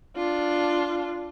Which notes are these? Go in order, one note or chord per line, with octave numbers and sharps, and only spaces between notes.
D4 F4